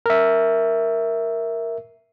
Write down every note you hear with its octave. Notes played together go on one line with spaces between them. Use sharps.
A#4 E5